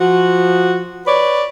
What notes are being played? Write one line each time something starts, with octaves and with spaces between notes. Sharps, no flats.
F3 F#4
B4 C#5 D5